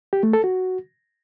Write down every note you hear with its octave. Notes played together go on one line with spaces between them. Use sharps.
G4
A3
A4
F#4